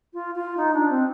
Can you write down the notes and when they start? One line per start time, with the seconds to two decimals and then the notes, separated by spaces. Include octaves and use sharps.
0.13 F4
0.35 F4
0.57 D#4
0.73 D4
0.89 C4